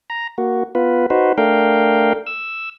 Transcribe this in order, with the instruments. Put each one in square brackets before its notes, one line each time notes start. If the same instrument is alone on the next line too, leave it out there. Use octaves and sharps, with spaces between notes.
[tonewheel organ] A#5
A#3 F#4
B3 F4 B4
D#4 F#4 B4 C5
A3 D4 A#4 F5 G5
E6